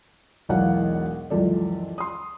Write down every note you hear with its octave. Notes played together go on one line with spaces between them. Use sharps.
E1 B1 E3 F#3 F5 F#5
C#2 F#2 E3 F3 A4 D5
C6 D#6